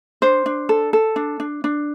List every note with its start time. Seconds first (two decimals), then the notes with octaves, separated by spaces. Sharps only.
0.22 D4 C5
0.46 D4
0.69 A4
0.93 A4
1.16 D4
1.40 D4
1.64 D4